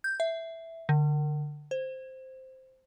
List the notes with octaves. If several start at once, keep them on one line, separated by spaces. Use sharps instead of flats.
G6
E5
D3
C5